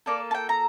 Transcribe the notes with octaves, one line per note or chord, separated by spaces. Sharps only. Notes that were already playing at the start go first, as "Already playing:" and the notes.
A#3 F4 A4 D5
A5
G5
A#5